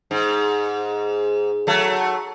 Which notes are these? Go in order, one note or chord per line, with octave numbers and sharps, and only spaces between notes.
G#2
F#3 A3